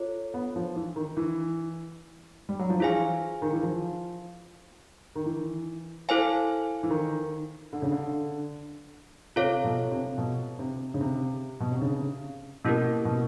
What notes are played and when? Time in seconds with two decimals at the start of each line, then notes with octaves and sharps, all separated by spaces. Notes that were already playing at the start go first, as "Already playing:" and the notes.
Already playing: F4 A4 C#5
0.34 B3
0.56 F3
0.76 E3
0.96 D#3
1.17 E3
2.49 G3
2.59 F#3
2.70 F3
2.80 E3 F4 G#4 C5 F5 G#5
3.42 D#3
3.53 E3
3.63 F3
5.15 D#3
5.26 E3
6.09 E4 A4 C5 F5 G#5
6.83 E3
6.90 D#3
7.73 D3
7.82 C#3
7.92 D3
9.36 C3 F4 A4 C#5 F5
9.64 B2
9.92 C3
10.18 B2
10.59 C3
10.94 C#3
11.01 C3
11.60 B2
11.72 C3
11.82 C#3
12.65 B2 A#3 C#4 E4 G4 A#4
13.05 B2